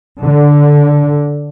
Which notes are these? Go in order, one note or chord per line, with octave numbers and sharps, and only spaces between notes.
D3